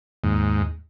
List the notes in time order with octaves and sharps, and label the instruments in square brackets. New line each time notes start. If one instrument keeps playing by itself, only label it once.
[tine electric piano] D#2 [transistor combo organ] G#2